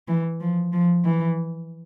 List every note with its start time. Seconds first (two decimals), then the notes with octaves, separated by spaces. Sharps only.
0.08 E3
0.40 F3
0.73 F3
1.05 E3